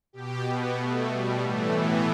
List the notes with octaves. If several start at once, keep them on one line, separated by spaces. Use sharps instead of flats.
B2 G4
B3
A3
G3
A2 E3 A3
B3